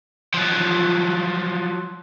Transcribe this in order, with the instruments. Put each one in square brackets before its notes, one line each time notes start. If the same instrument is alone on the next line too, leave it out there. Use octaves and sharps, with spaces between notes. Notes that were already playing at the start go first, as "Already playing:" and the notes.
[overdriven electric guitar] F3 F#3